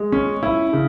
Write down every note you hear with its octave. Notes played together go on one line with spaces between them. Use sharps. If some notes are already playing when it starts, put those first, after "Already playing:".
Already playing: G#3
C#4
E4
C#3